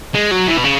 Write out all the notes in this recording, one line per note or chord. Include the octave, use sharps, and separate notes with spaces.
G#3
F#3
E3
B2
C#3